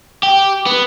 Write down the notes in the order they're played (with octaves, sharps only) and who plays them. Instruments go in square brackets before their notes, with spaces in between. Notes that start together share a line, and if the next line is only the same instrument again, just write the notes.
[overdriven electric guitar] G4
B3